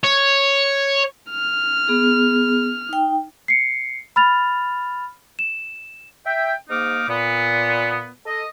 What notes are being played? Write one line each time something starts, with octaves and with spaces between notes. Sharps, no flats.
C#5
F6
B3 G#4
D#4 G5
C7 C#7
B5 F6 A6 F7
E7
E5 G5
G#2 A#3 D#4 D6 F6
A#2 B3
A4 D#5